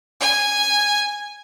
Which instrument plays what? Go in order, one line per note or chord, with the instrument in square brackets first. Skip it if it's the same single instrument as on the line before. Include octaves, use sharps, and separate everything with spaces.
[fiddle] G#5